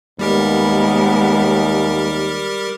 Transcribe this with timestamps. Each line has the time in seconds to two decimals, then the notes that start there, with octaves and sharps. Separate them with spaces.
0.19 D#2 G3 G#3 B3 G4 A#4